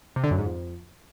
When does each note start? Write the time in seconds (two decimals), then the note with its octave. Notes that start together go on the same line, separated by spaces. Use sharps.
0.16 C3
0.24 D3
0.31 F#2
0.38 G#2
0.46 F2